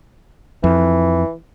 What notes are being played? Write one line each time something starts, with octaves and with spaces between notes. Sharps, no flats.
F2 E3